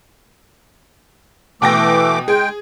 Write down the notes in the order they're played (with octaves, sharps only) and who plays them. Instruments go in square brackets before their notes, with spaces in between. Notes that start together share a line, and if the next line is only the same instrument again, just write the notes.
[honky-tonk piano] B2 G5 A#6 [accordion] E3 A3 D6
[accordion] G#3 G5 [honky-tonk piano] G#4